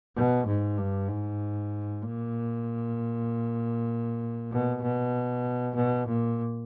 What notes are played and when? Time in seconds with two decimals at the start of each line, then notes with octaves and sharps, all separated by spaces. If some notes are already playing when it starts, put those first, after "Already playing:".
0.16 B2
0.47 G#2
0.78 G2
1.08 G#2
2.02 A#2
4.52 B2
4.82 B2
5.75 B2
6.07 A#2